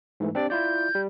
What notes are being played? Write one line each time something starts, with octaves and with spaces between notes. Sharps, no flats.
G#2 E3 A3
C4 D4 G4 D5
E4 F4 D5 G6
G3